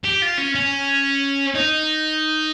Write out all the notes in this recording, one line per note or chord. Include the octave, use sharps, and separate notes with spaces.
G4
F4
C#4
C#4
D#4